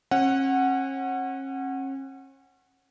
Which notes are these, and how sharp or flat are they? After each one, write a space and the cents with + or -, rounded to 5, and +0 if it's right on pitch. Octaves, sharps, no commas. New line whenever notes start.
C#4 -40 F#5 +0